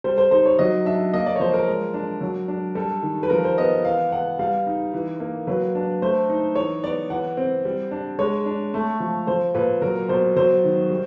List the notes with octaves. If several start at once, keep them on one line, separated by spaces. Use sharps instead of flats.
G3 C5
C5
D#4 C5
C#5
F#3 D#5
D4 E5
A#3 D#5
D5
C#5
F3 C5
A#4
G#3
D4
F#3
D4
G3 A4
D#3
B4
F3 A#4
C5
B3 D#5
E3 F5
B3 F#5
G3 F5
D#4
E3
A#3
F#3 B4
D4
A3 C5
D#4
E3 C#5
B3 D5
E3 F#5
C4
G3
D4
G#3 C#5
D4
A3
F3
F3 C5
A#2 B4
F#3 A#4
B2 C5
F#3 C5
D#3
G3